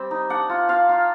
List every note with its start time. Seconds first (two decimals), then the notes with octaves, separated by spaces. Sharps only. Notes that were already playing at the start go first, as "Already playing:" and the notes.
Already playing: G3 C4
0.11 D#4
0.30 D4 F#5
0.50 F4
0.69 F4 F5
0.89 F4